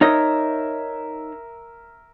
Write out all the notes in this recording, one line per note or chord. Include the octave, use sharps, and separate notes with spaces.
D#4 A#4 C#5 D#5 E5